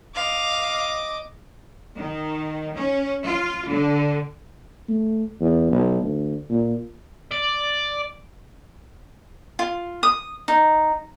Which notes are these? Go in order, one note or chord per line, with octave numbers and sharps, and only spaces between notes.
D#5 F5 D6
D#3
C#4
F4
D3
A3
E2
B1
D2
A#2
D5
F4
D#6
D#4